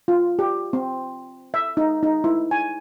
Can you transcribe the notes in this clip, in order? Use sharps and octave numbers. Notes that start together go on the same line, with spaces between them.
F4
G4
C4
E5
D#4
D#4
E4
G#5